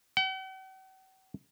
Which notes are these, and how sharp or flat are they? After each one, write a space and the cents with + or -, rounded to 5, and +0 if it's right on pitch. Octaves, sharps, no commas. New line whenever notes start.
F#5 +45